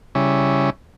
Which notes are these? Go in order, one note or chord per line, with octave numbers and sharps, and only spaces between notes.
C#3 G3 C#4 E4